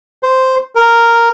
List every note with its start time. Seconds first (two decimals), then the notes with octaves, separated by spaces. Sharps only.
0.23 C5
0.75 A#4